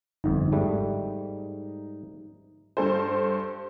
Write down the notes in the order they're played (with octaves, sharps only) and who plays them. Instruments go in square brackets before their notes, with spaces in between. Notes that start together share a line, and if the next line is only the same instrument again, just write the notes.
[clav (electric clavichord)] G1 F2 [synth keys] D#4
[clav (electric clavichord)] G#2 G3 A3
[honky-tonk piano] G2 A4 C5